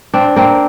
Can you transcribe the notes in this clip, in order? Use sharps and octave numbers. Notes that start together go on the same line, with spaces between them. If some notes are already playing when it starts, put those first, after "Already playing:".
C4 D4
A#3 C4